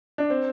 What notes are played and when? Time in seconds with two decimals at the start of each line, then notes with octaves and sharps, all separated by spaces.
0.18 D4
0.30 C4